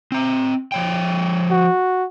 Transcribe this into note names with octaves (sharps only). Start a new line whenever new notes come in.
C4 A#5
F3 C#5 G5
F#4